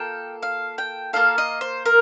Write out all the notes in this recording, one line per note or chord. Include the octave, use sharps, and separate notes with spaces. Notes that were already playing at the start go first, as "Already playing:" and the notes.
Already playing: A#3 F4 A4 G5
F5
G5
A#3 F4 A4 F5
D#5
C5
A#4